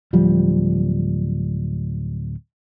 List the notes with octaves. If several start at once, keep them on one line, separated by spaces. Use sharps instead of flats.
D1 F3 G3